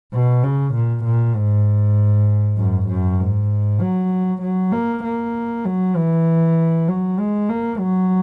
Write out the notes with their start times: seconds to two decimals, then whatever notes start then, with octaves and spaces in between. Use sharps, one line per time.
0.13 B2
0.43 C#3
0.74 A#2
1.05 A#2
1.36 G#2
2.58 F#2
2.89 F#2
3.20 G#2
3.81 F#3
4.42 F#3
4.72 A#3
5.04 A#3
5.65 F#3
5.96 E3
6.88 F#3
7.19 G#3
7.49 A#3
7.80 F#3